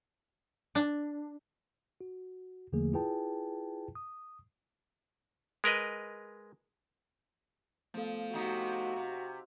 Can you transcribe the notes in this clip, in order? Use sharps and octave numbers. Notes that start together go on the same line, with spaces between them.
D4
F#4
E2 D3 F3 A3 A#3 G#4
E4 F4 G#4 B4 G5 A5
D#6
G#3 A#4 B4 D#5
F3 A3 B3 A4
C3 F3 D#4 F#4
C3